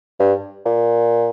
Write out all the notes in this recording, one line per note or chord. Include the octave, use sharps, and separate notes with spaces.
G2
A#2